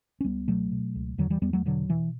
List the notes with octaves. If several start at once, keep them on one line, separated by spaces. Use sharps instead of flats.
C#4
C#2 G3 B3
B2 F#3 A3
B2
C#2
E2 D3 F#3
E3 G3
E2 G3 B3
F#3 A3
B2 D3 F#3
B2 E3